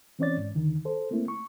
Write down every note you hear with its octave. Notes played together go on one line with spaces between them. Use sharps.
E3 C4 C#4 C#5 D5 A6
G#2
D#2 D3 D#3
A4 C5
A3 A#3 C4 E4
C#6